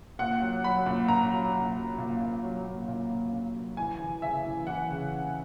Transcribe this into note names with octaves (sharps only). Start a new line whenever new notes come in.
A#2 F#5
F#3
F#3 B5
A#2
A#2 A#5
F#3
A#2
F#3
A#2
A#2
F#3
A#2
A#2
A#2
A#2
F#3
E3 G#5
E3
C#3 E5
E3
E3 F#5
C#3